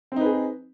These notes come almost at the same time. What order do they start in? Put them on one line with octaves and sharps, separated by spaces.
C4 D#4 B4 G#4